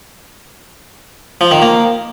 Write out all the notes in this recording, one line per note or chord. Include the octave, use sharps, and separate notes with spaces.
F3
D#3
A#3